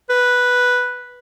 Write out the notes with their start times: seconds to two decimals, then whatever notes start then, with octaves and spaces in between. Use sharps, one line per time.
0.10 B4